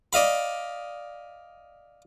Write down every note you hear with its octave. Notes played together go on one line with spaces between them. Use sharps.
D5 D#5 F5 B5